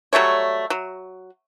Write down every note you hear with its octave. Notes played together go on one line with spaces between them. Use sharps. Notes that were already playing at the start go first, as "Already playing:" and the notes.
F#3 G3 A3 C#5
F#3